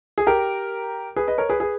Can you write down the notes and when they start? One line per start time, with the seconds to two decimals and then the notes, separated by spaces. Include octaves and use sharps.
0.18 G#4
0.27 G4 A#4
1.16 G#4 B4
1.28 B4 D#5
1.38 A#4 C#5
1.50 G#4 B4
1.60 G#4 B4